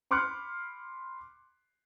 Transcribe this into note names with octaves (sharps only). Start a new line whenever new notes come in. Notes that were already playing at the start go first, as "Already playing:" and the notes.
B5 C6 D6 F6 F#6 C#7